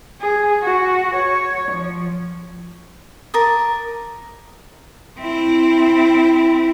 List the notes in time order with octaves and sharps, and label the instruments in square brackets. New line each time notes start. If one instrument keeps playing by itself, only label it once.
[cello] G#4
F#4
C#5
F3
[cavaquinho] A#4 A5 D6 D#6
[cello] C4 E4